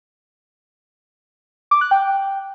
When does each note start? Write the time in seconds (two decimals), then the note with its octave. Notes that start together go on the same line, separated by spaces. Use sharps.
1.71 D6
1.81 F#6
1.91 G5